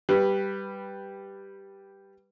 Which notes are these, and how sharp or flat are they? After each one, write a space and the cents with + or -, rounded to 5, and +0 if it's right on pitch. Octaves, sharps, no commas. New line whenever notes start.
G3 +0 B4 +0